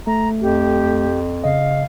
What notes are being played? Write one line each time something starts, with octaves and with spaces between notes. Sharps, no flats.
A3 A#5
F2 G4
C#3 D#5 F5